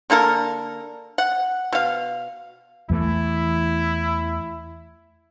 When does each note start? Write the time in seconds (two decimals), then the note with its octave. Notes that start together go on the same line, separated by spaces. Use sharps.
0.10 D3 A#3 A4 A#4
1.18 F#5
1.73 B2 F5
2.90 E2 E3 A3 E4